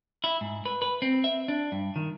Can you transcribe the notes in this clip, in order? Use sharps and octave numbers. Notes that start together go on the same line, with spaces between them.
E4
G#2
B4
B4
C4
E5
D4
G2
D#3